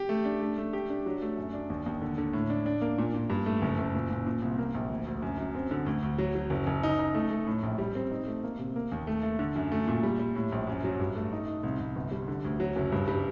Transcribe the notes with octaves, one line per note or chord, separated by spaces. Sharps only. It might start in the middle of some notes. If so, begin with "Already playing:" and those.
Already playing: G4
A3
D4
A3
A3
G4
D4
F#3
A3
F#2
D4
D#2
D#2
D3
D3
A2
D4
D4
A#3
A#2
A#2
G2
A3
F#1
F#1
A#2
A#2
A#2
C2
A#3
A#1
D2
D2
F#2
F#2
C4
D3
D2
D2
F#3
F#3
F#1
F#1
D#4
D#4
A3
A3
A2
A#1
G3
C4
D#4
A3
A#3
C3
A#3
D#2
A3
A3
D3
F#2
A3
A#2
G3
G3
A2
A#1
F#2
F#3
G2
A3
D#4
D#4
C2
C2
G1
G3
D3
D2
F#3
F#1
G2
G3